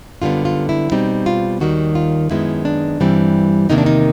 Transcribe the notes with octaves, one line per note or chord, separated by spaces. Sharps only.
F#2 D3 G3 B3 F4
F4
E4
B2 G3 C4 D#4
F4
D#2 D#3 G3 F#4
F4
F#2 D#3 G#3 B3 E4
D4
G2 E3 G3 C4
E2 C3 D#3 G3 A#3 D#4
D4
D#4